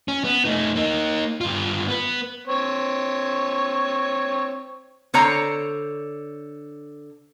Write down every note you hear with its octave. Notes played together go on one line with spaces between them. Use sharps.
C#4
B3
A3 D#4
A#3 D#4
G2 F4
B3 B4
C4 C#5
D3 C5 C#5 A#5